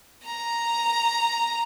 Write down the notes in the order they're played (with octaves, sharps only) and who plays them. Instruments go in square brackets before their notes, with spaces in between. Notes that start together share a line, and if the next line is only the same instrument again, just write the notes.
[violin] A#5